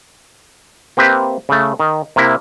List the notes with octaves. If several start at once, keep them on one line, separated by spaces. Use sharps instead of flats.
A#3 C4 G4 B4 E5
C#3 A3
D#3
C3 A#3 E4